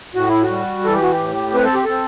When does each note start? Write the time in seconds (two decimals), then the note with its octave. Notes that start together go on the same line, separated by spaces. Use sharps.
0.15 A2 F#4
0.29 E4
0.43 F#4
0.50 G3
0.85 E3 A4
0.94 G4
1.03 F#4
1.12 G4
1.19 A2
1.54 C4 B4
1.64 A4
1.74 G4
1.85 C4 A4